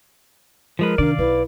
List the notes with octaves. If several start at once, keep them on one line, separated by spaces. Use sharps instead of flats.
F3 G#3 A#4 B4
C3 D#3 D4 D5 F5
B1 E4 B4